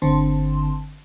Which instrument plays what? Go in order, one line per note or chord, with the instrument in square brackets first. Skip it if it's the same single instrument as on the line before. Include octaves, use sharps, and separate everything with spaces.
[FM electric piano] G1 D3 C4 A5 C6